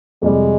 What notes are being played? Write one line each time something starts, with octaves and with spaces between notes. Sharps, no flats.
F2 C3 G3 G#3